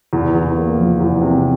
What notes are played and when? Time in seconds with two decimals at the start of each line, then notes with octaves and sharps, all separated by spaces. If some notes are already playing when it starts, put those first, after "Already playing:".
0.13 E2
0.35 E2
0.57 A#3
0.78 F3
1.00 E2
1.21 C3